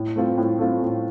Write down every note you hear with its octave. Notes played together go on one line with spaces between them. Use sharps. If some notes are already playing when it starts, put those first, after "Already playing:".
Already playing: A2
A3 C4 F4
A2
A3 C4 F4
A2